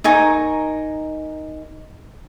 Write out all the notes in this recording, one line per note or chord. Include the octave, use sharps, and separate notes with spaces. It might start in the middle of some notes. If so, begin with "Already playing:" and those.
D#4 A#4 G#5 C#6